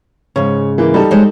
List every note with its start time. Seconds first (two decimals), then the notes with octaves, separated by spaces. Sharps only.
0.36 G#2 C#3 C#5
0.78 E3 A#3
0.94 G3 D#4 A4
1.11 G#3 C5 C#5